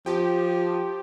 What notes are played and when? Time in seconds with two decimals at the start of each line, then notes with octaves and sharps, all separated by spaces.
0.06 F3 G4